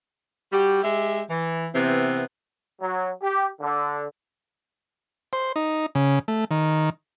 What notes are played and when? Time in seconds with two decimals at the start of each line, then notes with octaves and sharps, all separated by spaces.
0.53 G3 F#4 G4
0.84 G#3 G4 E5
1.30 E3
1.75 C3 E3 B3 C4
2.80 F#3
3.22 G4
3.61 D3
5.33 C5
5.56 D#4
5.95 C#3
6.28 A3
6.51 D#3